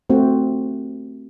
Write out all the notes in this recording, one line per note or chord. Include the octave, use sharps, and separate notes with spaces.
A3 C4 F#4